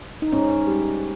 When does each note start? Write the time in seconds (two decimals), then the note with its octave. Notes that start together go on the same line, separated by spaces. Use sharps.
0.22 D#4
0.32 G#2 C#4
0.67 G3